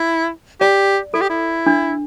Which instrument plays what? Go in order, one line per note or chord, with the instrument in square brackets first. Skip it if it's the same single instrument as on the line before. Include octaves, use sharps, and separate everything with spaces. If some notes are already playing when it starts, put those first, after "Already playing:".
Already playing: [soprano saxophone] E4
[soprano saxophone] G4 [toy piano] D5
[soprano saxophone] E4 [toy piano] A4
[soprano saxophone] G4
E4
[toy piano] D4